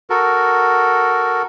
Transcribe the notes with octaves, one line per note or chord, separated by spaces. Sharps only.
F#4 A4 A#4